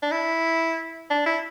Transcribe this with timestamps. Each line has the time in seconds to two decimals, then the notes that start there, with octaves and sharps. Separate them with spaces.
0.02 D4
0.11 E4
1.10 D4
1.26 E4